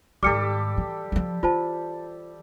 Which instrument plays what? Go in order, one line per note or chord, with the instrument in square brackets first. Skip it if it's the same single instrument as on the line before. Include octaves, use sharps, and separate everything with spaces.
[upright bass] G#2 D#3 [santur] G3 G4 A4 [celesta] D6 F6 C#7
[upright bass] E3
E3 F3
[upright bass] E3 [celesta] F4 C5 A5